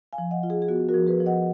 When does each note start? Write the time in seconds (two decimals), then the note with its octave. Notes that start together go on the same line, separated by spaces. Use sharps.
0.13 F5 G#5
0.18 F3
0.31 D#5 F#5
0.43 F4
0.50 G#4
0.62 G#4
0.68 B3 F#4
0.89 F#4 A#4
0.94 F3
1.07 G#4 B4
1.20 F3
1.26 D#5 F#5